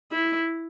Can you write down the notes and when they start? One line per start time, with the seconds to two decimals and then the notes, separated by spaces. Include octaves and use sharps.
0.12 E4